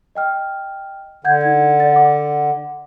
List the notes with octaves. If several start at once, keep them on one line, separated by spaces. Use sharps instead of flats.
D#5 G5 F6
D3 F#5 G6 G#6
D#4 G#6
D5 A6
F#5 D6